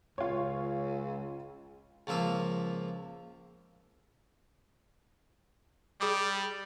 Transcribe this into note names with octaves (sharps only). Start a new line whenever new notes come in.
C#2 F4 C#5
C#2 F3 A#3 E5 F5
G3 G#4 D6